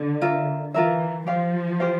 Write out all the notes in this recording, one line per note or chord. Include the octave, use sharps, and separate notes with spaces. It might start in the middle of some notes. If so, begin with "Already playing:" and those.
Already playing: D3
F4 A#4 E5
E3 F4 A#4 E5
F3 G4 C5 F5
G4 C5 F5